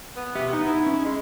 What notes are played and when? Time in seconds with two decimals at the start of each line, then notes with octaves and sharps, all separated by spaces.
0.17 B3
0.35 G4 E5
0.53 D#4
0.66 E4
0.86 C#4
1.05 G#3